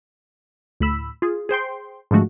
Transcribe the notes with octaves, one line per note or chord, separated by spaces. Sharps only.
D2 A2 B5 E6
F4 G#4
G#4 C5 G5 C6
G#2 D3 F3 G#3 A3 F#4